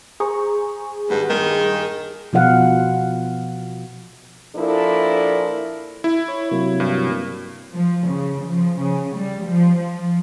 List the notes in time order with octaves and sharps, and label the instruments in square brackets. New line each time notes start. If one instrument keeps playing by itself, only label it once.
[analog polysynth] G#4 [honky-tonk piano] C5 A#5 C#6
[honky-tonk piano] G#1 F#5 [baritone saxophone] G2
[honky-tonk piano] G2 A#2 [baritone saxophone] D#3
[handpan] B2 F3 F4 F5 F#5
[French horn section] A#2 F3 D4 E4 A4 A#4
[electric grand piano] E4
[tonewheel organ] C#5
C3 F#3 A#3
[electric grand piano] G2
[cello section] F3
C#3
F3
C#3
G3
F3
F3